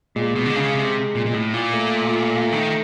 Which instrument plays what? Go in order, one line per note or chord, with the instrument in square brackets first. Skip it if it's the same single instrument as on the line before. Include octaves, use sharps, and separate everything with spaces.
[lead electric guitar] A#2 [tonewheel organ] G#3
[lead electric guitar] B2
D3
C#3
C3
A#2
A#2
A2
A#2
[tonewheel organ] A3
[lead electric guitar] D#3